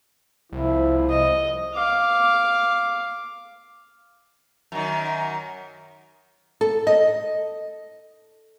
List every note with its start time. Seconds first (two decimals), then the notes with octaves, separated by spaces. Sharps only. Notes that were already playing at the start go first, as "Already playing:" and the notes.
0.52 C2 F3 E4
1.10 D#5
1.75 F5 D6
4.72 F#2 D#3
6.61 A4
6.87 D#5